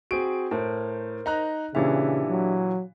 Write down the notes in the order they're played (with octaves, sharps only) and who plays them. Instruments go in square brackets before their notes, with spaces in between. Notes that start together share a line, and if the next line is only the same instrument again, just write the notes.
[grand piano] C4 G#4 D7 [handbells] F#4
[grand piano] A2 [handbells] A#4 C5
[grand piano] D#4 A#5 F#6
[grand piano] A#2 E3 [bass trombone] C#3 [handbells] D4 G4 E5
[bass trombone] F#3